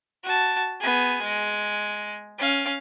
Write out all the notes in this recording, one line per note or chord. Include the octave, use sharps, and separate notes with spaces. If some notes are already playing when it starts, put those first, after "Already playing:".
F#4 A5
B3 G#4
G#3
C#4 F5